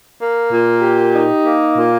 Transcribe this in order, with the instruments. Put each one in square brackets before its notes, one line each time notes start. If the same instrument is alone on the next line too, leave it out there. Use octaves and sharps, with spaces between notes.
[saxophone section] A#3
A#2
G4
D#4
A#3
A#2